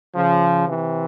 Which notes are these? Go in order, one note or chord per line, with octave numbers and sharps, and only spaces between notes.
C#3 F3
C3 E3